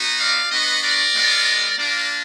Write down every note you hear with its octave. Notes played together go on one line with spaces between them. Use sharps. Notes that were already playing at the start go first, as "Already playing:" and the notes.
Already playing: B3 D#4 F#4
D5 F5
B3 D4 F#4 B4 D#5
A#4 D5
G#3 B3 F4
A#3 D4 F4 A#4 D5